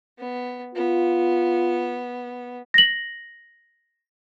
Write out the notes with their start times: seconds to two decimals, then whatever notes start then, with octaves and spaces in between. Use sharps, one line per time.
0.18 B3
0.75 B3 F4
2.74 A#6 F#7